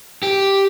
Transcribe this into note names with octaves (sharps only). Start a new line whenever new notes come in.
G4